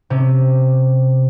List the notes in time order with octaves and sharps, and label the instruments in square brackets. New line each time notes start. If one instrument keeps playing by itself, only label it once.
[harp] C3 C#4